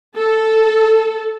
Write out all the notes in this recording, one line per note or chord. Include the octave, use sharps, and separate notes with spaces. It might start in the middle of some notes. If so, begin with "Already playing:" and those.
A4